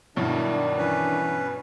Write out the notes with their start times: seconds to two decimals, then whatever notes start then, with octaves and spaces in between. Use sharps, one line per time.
0.16 G2 B2 D#3 F#3 D4 E4 D5
0.78 E3 C#4 B4